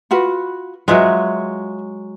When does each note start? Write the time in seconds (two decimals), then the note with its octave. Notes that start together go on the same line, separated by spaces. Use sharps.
0.11 F4 F#4 B4
0.88 F#3 G#3 F4 B4 E5